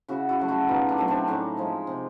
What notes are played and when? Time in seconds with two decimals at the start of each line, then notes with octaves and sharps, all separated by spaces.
0.08 C#3 E4 F#4
0.29 E4 F#4
0.39 F#3 A3
0.48 E4 F#4
0.69 B2 D#4 F4
0.89 D4 E4
0.98 F#3 A3
1.08 C4 D4
1.27 A2 C#4 D#4
1.57 F3 G#3
1.87 C3